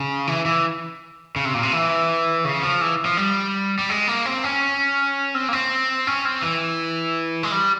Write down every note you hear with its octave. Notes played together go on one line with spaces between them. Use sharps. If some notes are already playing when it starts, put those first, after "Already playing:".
Already playing: C#3
E3
E3
C#3
C3
A#2
C3
E3
C#3
F3
E3
F3
G3
G3
G#3
A#3
C4
C#4
C4
A#3
C4
C#4
C4
E3
G#3
G3